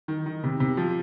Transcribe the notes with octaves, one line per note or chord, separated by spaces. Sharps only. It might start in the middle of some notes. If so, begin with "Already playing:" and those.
D#3
D#3
C3
C3
F3